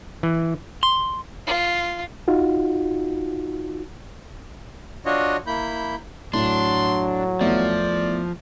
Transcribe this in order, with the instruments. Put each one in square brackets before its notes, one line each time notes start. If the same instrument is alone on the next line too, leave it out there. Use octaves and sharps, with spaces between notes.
[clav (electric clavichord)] E3
[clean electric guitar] C6
[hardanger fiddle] F4
[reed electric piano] D#4 F4 F#4
[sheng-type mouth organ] D4 F4 F#4 C#5 D#5
A#3 E4 B5 G6
[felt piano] A2 [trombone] F#3 [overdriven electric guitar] D4 [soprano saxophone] C6
[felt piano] E2 A3 [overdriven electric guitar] F3 [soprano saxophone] D5